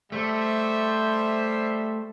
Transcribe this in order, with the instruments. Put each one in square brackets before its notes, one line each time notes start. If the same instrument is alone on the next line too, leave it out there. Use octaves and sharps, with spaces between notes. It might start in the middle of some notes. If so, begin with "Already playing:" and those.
[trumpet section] G3 C5 E5 [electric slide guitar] A3